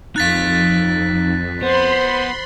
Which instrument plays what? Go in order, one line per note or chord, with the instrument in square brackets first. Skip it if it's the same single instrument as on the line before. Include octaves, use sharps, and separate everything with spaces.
[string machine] F2 [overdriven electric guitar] D#4 F5 [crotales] F#6 A6 B6
[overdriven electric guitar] B3 [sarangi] C5 [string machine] B5 C6